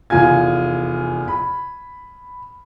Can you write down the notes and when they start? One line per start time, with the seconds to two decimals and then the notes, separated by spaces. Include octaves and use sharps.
0.10 F1 E2 F4 G#5 G#6
1.28 B5